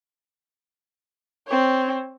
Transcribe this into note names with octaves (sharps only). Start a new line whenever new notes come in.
C4 C#5